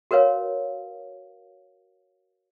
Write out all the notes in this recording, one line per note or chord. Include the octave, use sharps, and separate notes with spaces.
F#4 A#4 B4 C#5 F5